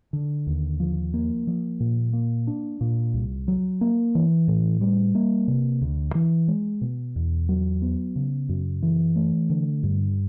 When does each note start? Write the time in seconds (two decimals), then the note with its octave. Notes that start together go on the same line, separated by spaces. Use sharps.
0.13 D3
0.47 D#2
0.80 F3
1.14 A#3
1.47 F3
1.80 A#2
2.13 A#3
2.47 D4
2.81 A#2
3.14 C2
3.48 F#3
3.81 A#3
4.15 E3
4.48 A2
4.81 G3
5.15 A#3
5.48 C3
5.81 D2
6.15 E3
6.48 G#3
6.81 B2
7.16 E2
7.49 F#3
7.82 B3
8.16 C#3
8.49 F#2
8.82 E3
9.16 A3
9.50 D3
9.83 G2